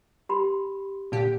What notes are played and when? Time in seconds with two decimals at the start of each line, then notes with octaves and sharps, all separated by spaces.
0.29 G4 B5 C6
1.12 A#2 D3 G4